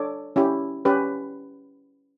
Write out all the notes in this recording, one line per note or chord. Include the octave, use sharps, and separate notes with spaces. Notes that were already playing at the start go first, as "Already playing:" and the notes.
Already playing: D4 A4 C#5 D6
C#4 E4 G4
C#4 G4 B4